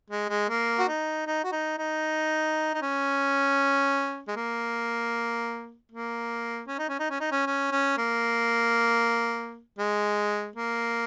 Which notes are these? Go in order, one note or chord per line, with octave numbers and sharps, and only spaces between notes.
G#3
G#3
A#3
F#4
D#4
D#4
F#4
D#4
D#4
D#4
C#4
G#3
A#3
A#3
C#4
D#4
C#4
D#4
C#4
D#4
C#4
C#4
C#4
A#3
G#3
A#3